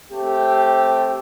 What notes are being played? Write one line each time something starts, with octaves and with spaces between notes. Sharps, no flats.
A3 C4 G4